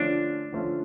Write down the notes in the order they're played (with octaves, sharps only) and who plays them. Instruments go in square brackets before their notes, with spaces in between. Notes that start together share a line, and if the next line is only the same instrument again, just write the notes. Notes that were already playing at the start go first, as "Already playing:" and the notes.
Already playing: [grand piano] D3 F3 A3 C#4 F4 [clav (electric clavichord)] D4
[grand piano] D3 F3 A3 C#4 F4